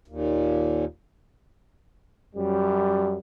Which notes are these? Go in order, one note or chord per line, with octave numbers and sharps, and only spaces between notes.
D#2 A#2
F#2 G3